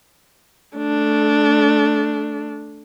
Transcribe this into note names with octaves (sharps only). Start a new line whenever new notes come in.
A3 D4